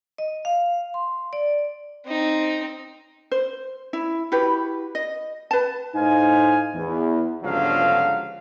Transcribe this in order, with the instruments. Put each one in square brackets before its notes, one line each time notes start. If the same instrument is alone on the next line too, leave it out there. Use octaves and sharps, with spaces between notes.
[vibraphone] D#5
F5
C6
D5
[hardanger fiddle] C4 D#4
[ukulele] C5
E4
E4 F#4 G4 B4
D#5
B4 A5
[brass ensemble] A2 D#4 C5 F5 G#5
E2
G1 C#2 D3 F3 F#3 F5